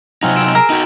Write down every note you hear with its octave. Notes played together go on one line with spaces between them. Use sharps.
C3 F#3 C4 D#4 F4 F#5 G#5 A#5
E6 D7 E7
G#4 A#4
D#4 F#4 G5 G#5 A#5